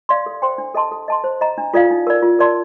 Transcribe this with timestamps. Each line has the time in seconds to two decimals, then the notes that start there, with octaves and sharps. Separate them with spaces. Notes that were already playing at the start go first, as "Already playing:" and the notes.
0.09 D5 F5 C6
0.26 A4
0.42 C5 G5 C6
0.58 D4
0.74 A4 D#5 A5 C6
0.92 A4
1.08 D#5 A5 C6
1.24 C5
1.41 D#5 A#5
1.58 D4
1.74 F4 A4 D5 F5
1.91 D#4
2.07 A#4 D5
2.22 F4
2.39 A#4 D5 A5 C6